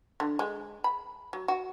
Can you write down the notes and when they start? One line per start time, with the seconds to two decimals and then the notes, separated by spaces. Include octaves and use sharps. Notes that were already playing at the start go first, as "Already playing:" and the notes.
0.20 D3
0.39 G#3
0.84 B5
1.33 F#3
1.48 F#4